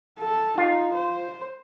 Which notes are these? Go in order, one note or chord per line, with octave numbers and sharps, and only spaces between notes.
A4
D#4 F4
C5